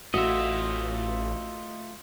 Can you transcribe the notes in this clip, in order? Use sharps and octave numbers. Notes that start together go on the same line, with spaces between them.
A1 A3 F4 F#4 D#5 E5